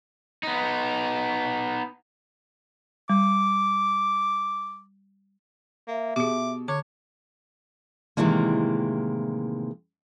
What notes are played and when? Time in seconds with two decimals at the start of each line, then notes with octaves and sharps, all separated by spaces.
0.43 B3 D#4
3.10 G3 D6
5.88 A#3 E5
6.16 B2 G4 G#4 D6
6.68 D3 C#5 D6
8.17 A2 C3 D#3 E3 G#3 A#3